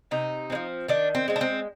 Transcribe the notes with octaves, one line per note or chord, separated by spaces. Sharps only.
C3 D#4
G#3 C4
F3
D#3 D4
C4
G#3 C4
D4
C4